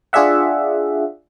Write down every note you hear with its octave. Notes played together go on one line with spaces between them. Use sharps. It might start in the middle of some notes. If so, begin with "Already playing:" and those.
D4 F4 G#4 D5 E5 F#5